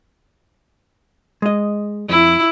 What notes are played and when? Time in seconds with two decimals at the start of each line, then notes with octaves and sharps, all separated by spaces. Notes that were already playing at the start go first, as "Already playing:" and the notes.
1.42 G#3 D#5
2.09 F2 E4